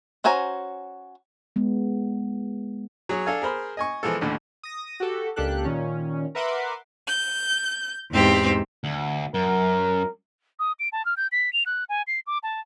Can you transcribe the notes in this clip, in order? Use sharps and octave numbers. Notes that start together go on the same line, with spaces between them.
C#4 F#4 C5 G#5 A#5
G#3 B3
F#3 G#4 C#5
D4 A4 F5 G#5
G#4 A#4 C5 B5
D#5 G#5 C#6
E3 F3 G#3 A4
A1 D#2 A2 D3
D#6 A#6
F#4 G4 A4
C#2 A#3 D4 G4 A4 F#6
A#2 D#3 C#4
A#4 B4 E5 F#5 C6 D6
G6
E2 G#2 C4 G4
D2
F#2 A#4
D#6
D7
A5
F6
G6
B6
F7
F#6
G#5
C7
D6
A5